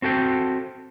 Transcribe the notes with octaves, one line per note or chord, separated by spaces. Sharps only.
C4 F#4 A4 G5